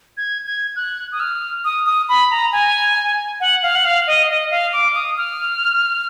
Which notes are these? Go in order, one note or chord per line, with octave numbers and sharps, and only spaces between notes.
G#6
G#6
F#6
D#6
F6
D#6
D#6
B5
A#5
G#5
F#5
F5
F#5
F5
D#5
D#5
F5
D6
D#6
F6